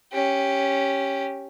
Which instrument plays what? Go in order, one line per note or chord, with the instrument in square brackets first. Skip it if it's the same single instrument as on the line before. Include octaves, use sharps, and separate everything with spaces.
[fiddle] C#4 G4